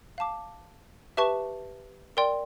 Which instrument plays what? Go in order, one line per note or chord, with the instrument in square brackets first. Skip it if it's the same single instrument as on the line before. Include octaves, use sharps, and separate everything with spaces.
[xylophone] F5 A5 D6
G4 B4 E5 A5 C#6
A#4 D5 G5 C6